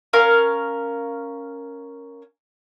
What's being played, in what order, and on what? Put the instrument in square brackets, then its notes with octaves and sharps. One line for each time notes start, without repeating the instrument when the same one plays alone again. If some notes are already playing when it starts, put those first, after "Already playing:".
[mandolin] C#4 A#4 F5